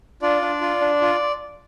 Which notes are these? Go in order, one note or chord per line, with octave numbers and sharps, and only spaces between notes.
D4 F4 D5
D4
F4
D4
F4